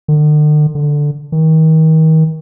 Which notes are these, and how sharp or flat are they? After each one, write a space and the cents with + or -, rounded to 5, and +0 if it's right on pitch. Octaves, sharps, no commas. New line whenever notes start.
D3 +45
D3 +0
D#3 +35